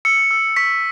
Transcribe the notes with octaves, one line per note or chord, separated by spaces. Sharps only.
E6 C#7
E6
C#6 B6